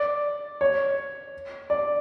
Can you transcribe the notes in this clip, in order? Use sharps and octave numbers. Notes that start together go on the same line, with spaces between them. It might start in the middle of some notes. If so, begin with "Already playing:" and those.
Already playing: D5
C#5
D5